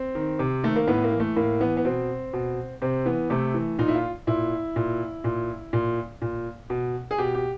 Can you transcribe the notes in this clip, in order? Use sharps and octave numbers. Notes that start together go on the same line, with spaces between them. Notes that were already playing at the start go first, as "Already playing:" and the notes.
Already playing: C4
D#3
C3
D#3 A3
A#3
A2 B3
A#3
E3
A3
A2 A#3
E3 B3
B3
B2 C4
B2
C3 C4
E3 B3
C3 A3
E3
A#2 D#4
E4
F4
A#2 E4
A#2
A#2
A#2
A#2
B2
G#4
B2 G4
G4